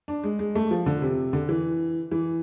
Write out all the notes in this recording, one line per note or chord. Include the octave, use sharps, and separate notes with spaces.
D4
G#3
G#3
A3
F3
D3
C3
D3
E3
E3